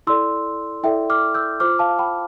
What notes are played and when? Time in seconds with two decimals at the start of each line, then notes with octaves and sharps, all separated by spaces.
0.07 E4 A4 D5 C6 E6
0.83 E4 A4 D5 E5 G5
1.10 D6 F6
1.34 E6 G6
1.60 F4 C5 D6 F6
1.79 F5 A5
1.99 G5 B5